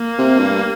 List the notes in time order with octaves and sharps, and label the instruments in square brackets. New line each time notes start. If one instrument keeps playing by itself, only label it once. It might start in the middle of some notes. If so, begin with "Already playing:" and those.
Already playing: [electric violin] A#3
[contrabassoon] C3
G2